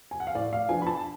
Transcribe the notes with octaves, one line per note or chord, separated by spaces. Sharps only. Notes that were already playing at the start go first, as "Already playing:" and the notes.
G#5
F#5
F5
A2 D5
F5
F3 B3 D4 G#5
B5
A5